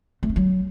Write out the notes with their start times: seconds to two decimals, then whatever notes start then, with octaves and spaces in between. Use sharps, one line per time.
0.23 A3
0.29 C#4
0.36 F#3